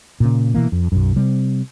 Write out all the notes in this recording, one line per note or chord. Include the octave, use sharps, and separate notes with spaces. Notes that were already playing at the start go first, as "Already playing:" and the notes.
A#2 C#3
B2 E3 A#3
F2
B1 F#2
C3 G3 C4